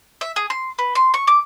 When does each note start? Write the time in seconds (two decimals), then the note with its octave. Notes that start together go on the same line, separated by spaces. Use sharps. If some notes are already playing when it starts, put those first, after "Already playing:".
0.21 E5
0.36 G#4
0.50 C6
0.79 B4
0.95 C6
1.14 C#6
1.27 D6